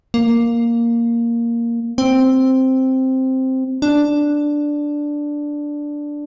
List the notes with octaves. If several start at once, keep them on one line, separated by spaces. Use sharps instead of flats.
A#3
C4
D4